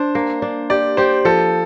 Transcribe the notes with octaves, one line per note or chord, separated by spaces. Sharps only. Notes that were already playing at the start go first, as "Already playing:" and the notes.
Already playing: D4 C5
A#3
D4
G4 D5
G4 C5
F3 A4